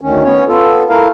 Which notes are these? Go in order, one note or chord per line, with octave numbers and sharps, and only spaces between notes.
D2 D#3 C#4
B3 C#4 C#5
B3 F4 A4
A3 E4 A#4 F5